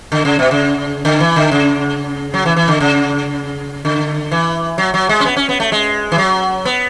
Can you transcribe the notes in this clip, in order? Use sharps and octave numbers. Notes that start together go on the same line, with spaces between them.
D3
C#3
B2
C#3
D3
E3
D3
C#3
F#3
E3
E3
D3
C#3
D3
E3
F#3
F#3
G#3
C#4
B3
C#4
B3
A3
G#3
E3
F#3
B3